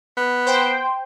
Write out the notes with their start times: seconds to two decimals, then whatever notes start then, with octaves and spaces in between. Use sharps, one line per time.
0.17 B3
0.46 C5 G5